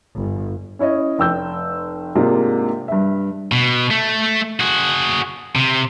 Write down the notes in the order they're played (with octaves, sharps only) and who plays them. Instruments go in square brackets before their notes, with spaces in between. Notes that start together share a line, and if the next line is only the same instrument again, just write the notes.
[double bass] G1
[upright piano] C#4 E4 C#5 D#5
F1 G5 E6 G6
G#2 C3 G#3 A#3 D4 F4
G2 E5
[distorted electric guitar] B2
A3
F#4 G#4
C3